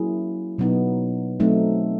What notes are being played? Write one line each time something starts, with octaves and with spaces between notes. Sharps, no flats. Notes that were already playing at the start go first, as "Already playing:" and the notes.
Already playing: F#3 A#3 C#4 E4 G#4
B2 F#3 B3 D#4
F#3 A3 C4 D#4